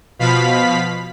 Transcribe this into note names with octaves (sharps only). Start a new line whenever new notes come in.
B2 F3 F5 B5 B6